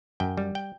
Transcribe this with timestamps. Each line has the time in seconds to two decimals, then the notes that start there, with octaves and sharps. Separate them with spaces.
0.20 F#2 G5
0.37 G3
0.55 G5